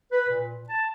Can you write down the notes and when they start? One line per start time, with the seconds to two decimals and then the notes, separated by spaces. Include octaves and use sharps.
0.11 B4
0.29 A#2
0.69 A5